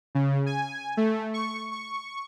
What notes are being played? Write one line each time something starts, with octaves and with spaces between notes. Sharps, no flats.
C#3
G#5
A3
C#6
C#6